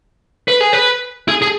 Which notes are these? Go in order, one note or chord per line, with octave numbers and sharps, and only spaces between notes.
B4
G#4
B4
G#4
G#4